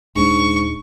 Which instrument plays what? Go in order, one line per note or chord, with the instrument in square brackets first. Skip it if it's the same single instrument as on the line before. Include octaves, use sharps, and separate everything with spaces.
[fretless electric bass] D#1 D4 [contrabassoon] G#2 [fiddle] C#6